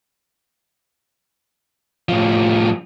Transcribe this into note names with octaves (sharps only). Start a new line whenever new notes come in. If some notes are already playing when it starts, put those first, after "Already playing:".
A2 F3